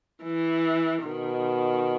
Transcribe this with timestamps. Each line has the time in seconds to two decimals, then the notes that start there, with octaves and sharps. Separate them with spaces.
0.23 E3
1.02 B2 D#3